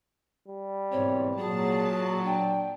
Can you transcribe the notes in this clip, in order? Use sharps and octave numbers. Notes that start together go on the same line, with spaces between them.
G3
G#2 B2 E3 C4 C#5
A#2 F#3 G#4 A5
D4 G5